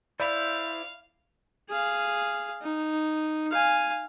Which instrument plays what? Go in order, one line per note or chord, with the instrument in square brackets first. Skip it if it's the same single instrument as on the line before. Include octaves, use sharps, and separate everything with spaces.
[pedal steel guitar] E4 C5 [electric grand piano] D5 B5 [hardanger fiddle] F5
[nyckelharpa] G#4 F5
D#4
F5 G#5